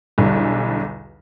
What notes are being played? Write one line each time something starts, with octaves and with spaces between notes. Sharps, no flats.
B1 E2 D3 G3